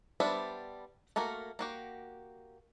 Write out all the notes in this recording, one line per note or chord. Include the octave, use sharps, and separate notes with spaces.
G3 B3 D4 C5 E5
A3 A#3 F#4 A#4
A#3 F#4 G4